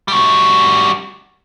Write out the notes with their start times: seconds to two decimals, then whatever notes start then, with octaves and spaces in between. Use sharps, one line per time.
0.08 G3 F#4